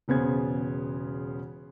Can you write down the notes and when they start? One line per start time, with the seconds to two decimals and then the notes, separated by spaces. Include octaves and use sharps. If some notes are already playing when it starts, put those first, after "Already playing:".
0.08 E1 C#3 B3 C5 G#6